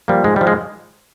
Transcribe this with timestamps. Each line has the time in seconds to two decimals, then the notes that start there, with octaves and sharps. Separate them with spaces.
0.08 F3 G3 A#3
0.24 G#2 G#3
0.36 G3
0.41 F3
0.47 G#3